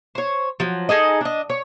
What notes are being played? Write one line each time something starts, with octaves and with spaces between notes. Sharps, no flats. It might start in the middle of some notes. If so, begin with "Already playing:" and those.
C5 C#5
F3 F#3
D#4 G#4 A4 D#5
D4 D#5
C#5